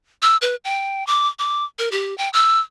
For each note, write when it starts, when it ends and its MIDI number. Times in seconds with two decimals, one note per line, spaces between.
0.22 0.37 88
0.42 0.56 71
0.65 1.06 79
1.07 1.28 86
1.39 1.65 86
1.79 1.89 70
1.92 2.16 67
2.18 2.29 79
2.33 2.59 88